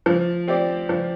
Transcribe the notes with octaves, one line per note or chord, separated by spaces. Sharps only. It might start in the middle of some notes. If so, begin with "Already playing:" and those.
F3
C4 G4 D5
F3